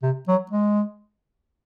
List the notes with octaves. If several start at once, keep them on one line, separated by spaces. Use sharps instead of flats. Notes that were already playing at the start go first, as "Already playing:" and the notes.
C3
F#3
G#3